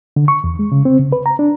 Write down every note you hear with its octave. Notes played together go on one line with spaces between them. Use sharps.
D3
C#6
E2
G#3
C#3
C4
C#3
B4
A#5
D4